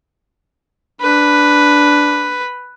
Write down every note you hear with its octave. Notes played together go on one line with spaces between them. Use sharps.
D4 B4